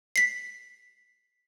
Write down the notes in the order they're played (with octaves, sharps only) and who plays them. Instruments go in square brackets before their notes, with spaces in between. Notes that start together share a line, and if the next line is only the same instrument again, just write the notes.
[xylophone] B6 C7